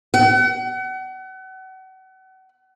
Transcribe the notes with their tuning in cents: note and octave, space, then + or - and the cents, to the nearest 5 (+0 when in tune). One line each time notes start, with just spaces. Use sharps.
F#5 +35